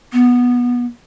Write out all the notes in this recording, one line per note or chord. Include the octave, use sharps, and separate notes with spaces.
B3